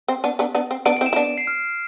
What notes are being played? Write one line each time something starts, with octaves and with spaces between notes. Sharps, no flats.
C4
B3 D4
B3 D4
B3 D4
C4
B3 D4 D7
D7
C4 E4
E7
E4
B3 D4 D7
C7
F6